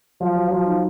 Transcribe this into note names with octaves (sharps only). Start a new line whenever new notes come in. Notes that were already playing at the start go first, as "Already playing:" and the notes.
F3 F#3
F#3
F3 F#3
D#4